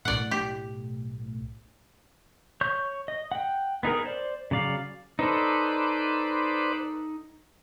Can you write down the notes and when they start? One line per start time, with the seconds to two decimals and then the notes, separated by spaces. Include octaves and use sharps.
0.05 B1 A2 D5 F#5
0.31 G4
2.61 C#5 C#6 G6
3.08 D#5
3.32 F#5 G5
3.83 B3 D#4 G#4 A#4
4.06 C5 D5
4.51 C#3 F#3 D5 F5
5.19 D#4 A4 B4 C5 D5